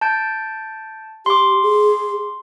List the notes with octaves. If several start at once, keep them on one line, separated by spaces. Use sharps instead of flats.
A5 G6 D7
G4 C6 D6
G#4